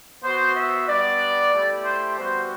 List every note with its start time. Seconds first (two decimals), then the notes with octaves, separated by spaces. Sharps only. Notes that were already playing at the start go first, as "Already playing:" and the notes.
0.24 B3 F#4 C5
0.56 E5
0.89 G3 B3 D4 D5
1.53 A3 E4 G4
1.85 C5
2.18 G3 B3 F#4 C5